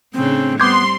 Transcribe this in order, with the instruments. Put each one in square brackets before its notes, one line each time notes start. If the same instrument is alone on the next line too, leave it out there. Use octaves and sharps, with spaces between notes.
[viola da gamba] A2 C#3 D4 [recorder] C4
[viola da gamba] G3 C4 [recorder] B3 [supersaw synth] C6 [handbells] D6 G6 G#6